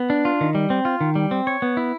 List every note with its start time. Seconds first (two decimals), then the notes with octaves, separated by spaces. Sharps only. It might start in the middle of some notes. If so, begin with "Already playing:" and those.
Already playing: B3
0.10 D4
0.25 F4
0.41 D#3
0.55 G3
0.70 C4
0.85 F4
1.01 D#3
1.15 G3
1.31 C4
1.47 C#5
1.62 B3
1.77 E4